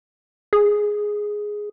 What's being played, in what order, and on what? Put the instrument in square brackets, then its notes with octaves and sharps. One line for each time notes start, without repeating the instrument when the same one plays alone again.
[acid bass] G#4